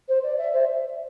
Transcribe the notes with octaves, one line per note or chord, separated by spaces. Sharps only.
C5
D5
E5
C5